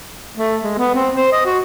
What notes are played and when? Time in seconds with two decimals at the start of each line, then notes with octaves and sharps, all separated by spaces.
0.38 A3
0.64 G#3
0.78 B3
0.95 C4
1.16 C5
1.32 D#5
1.46 F#4